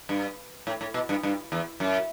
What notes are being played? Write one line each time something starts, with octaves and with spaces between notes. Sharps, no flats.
G2
A2
A2
B2
G2
G2
E2
F#2